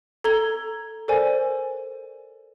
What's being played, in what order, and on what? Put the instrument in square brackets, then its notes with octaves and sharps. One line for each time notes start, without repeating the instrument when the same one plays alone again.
[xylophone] A4 A#5 G#6 G7
A4 A#4 C5 D5 G#5